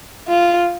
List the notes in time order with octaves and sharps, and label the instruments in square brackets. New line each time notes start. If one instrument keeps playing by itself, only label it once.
[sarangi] F4